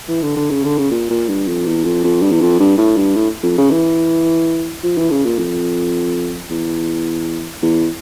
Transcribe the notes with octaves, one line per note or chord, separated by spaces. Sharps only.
E3
D3
D3
C#3
D3
C#3
A#2
A#2
G2
F2
E2
F2
F2
G2
E2
F2
G2
A2
G2
A2
F2
C#3
E3
F3
E3
C#3
A#2
F2
E2
E2